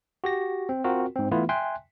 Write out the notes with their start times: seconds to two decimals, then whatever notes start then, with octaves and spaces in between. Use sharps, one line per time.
0.24 F#4 G4 A#6
0.69 C4
0.84 C4 F4 F#4 A#4
1.16 G#2 C4
1.31 E3 A3 B3 E4 F4 B4
1.49 E5 G5 G#5 C6 F#6